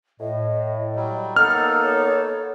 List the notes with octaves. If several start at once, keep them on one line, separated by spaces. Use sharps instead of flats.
A2 D#5
F#3 G3
A#3 B3 D#4 A4 F6
C#5